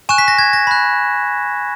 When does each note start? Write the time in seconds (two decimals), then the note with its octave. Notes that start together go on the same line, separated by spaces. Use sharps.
0.09 G#5 C#6 F#6 E7
0.18 B6
0.28 A#6
0.39 G#6
0.53 A#6
0.67 B5 F#6